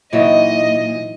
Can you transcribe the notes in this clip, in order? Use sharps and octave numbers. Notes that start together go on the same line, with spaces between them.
A#2 E3 F#3 D#4 D#5